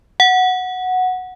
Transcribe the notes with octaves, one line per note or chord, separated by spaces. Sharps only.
F#5